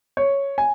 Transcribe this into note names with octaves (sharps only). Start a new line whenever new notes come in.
C#5
G#5